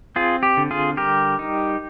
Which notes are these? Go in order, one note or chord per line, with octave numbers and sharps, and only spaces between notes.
C4 F4 G#4
G4
D3
F4 G#4
G3 G4 A#4
D#4